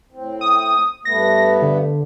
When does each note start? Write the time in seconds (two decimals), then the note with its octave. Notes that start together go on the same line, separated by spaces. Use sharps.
0.13 A2 C4
0.41 D#6
1.05 G2 A3 B3 A#6
1.62 D3